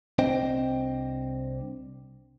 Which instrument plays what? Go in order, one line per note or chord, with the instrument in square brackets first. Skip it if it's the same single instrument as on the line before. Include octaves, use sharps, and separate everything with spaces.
[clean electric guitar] C2 C4 D4 C5 D#5 G5